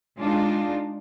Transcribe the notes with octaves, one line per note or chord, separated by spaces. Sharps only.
G#3 D4 D#4 F4